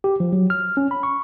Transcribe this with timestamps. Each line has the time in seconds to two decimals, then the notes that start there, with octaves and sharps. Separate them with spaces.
0.04 G4
0.20 F3
0.33 F#3
0.50 F6
0.77 C#4
0.91 B5
1.03 C#6